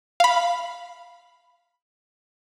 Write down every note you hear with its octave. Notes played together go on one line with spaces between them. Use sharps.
F5 B5